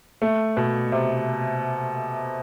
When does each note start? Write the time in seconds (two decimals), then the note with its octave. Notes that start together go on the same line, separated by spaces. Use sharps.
0.22 A3
0.57 B2
0.92 C3